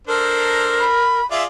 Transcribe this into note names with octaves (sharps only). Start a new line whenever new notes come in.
D4 A4 A#4 C5
B5
F4 G#4 D5 E5